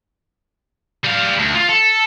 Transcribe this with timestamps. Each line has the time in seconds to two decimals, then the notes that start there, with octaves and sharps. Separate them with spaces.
1.04 G3 F5
1.39 D2
1.55 F4
1.69 A4